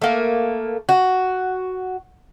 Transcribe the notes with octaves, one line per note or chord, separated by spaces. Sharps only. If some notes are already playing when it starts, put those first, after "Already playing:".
A3 A#3
F#4